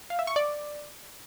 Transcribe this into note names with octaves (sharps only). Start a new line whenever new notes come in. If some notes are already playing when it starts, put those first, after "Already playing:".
F5
E5
C#6
D5